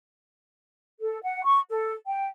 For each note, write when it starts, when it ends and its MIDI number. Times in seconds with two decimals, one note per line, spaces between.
1.00 1.19 69
1.23 1.44 78
1.45 1.60 85
1.70 1.93 69
2.07 2.26 79